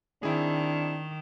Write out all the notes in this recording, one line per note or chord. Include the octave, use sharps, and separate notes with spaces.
D#3 C4 D4 E4 G#4